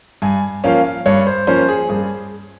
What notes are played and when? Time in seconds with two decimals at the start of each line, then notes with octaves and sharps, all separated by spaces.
0.22 G2 G#5
0.64 F3 A#3 C#4 F5
0.84 F5
1.06 G2 C#5
1.27 C5
1.47 F3 A#3 C#4 C5
1.68 G#4
1.89 G2 G#4